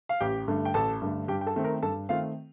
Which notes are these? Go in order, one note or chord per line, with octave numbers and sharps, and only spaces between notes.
F5
A1 G4 G5
G2 D3 A3
G5
A1 A4 A5
G2 D3 A3
G2 G4 G5
G5
A4 A5
D#3 A3 C4
A#4 A#5
G2 A4 A5
D#3 A3 C4 F4 F5